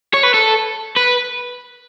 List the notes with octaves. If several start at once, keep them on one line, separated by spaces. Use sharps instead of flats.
C#5
B4
A4
B4